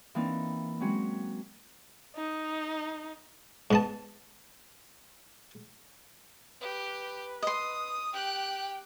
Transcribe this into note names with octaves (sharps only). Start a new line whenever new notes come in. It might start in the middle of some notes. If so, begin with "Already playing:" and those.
E3 A#3 C4 D4 D#4
F#3 G#3 C4 C#4 F#4
D#4
G#2 B3 A5
G4 B4
D#5 C6 D#6
G4 G5 F#6